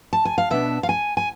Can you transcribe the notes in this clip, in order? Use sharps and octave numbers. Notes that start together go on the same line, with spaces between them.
A5
G#5
F5
B2 B3 D4 E5
F5
G#5
G#5